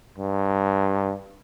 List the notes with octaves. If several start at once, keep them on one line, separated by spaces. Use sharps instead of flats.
G2